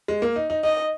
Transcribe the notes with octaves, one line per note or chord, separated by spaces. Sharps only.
G#3
A#3
D#4
D#4
D#4 D#5